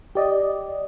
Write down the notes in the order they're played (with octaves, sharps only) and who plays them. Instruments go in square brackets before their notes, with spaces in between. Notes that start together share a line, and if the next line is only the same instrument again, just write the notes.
[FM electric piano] G4 D5 D#5